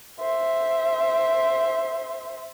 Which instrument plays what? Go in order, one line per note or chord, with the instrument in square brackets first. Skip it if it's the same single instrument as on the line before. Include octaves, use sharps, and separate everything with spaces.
[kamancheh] C5 E5